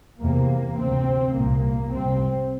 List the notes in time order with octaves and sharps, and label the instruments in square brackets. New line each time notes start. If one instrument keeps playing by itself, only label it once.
[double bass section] E2 C3 A#3
D2 C3 C4
C2 A#2 A#3
C2 C3 C4